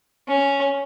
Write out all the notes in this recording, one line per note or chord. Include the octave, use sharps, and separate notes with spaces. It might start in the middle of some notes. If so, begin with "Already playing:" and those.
C#4